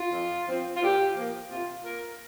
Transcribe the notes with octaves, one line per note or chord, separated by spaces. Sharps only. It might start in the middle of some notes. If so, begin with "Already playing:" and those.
Already playing: F4
F2
F3 C4
F4
A#2 G4
F3 A#3
C3 F4
A#3 A#4